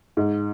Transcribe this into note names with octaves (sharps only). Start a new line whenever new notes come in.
G#2